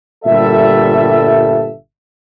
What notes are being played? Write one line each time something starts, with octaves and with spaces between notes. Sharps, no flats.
G1 A#2 G3 A4 E5